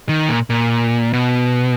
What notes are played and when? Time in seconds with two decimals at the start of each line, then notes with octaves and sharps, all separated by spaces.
0.09 D#3
0.29 A#2
0.50 A#2
1.13 B2